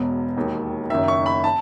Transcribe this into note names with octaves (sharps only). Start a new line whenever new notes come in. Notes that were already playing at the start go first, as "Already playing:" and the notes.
Already playing: E1 E2 B2
E1 D#2 D#3
F#1 F#2 D#3 E5
C#6
B5
A5